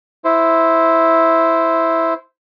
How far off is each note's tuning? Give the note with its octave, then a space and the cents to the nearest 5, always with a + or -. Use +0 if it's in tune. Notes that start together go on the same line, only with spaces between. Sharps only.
E4 -5 C5 -10